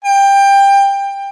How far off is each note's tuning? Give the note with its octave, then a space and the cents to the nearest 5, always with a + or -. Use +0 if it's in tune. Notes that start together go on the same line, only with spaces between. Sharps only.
G5 +20